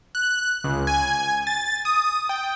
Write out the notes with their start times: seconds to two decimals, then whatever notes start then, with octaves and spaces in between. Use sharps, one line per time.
0.15 F#6
0.64 C#2
0.87 G#5
1.47 A6
1.85 D#6
2.29 G5